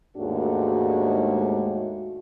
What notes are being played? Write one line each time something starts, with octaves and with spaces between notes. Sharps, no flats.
D#2 G#2 G#3 A3 D4 F#4